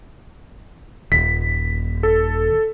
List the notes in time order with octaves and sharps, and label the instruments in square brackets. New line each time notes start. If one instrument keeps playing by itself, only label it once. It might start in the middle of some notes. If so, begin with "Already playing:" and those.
[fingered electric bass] D#1 [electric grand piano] B6
[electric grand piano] A4